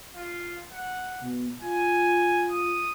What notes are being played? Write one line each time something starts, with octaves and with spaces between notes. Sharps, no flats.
F4
F#5
B2
F4 G#5
D#6